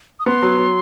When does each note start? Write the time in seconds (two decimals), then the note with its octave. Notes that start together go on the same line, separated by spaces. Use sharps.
0.20 D#6
0.26 B3 C6
0.42 F#3
0.57 F#3